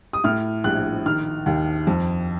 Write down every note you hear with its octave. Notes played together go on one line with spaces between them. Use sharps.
D#6
A2 F6
A#1 F#6
D#3 F6
D#2
F2